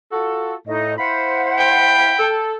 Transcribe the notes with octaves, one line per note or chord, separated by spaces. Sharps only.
F4 F#4 A4
A2 D#4 D#5
E4 C5 F5 F#5 B5
G5
A4